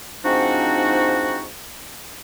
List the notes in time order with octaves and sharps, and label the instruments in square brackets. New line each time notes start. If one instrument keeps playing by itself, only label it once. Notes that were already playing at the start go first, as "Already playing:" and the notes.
[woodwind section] G#2 F3 C4 D4 D#4 F#4